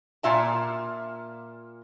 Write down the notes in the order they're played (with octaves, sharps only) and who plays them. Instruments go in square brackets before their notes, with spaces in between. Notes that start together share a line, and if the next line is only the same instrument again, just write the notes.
[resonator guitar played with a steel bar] A#2 F4 E5 A5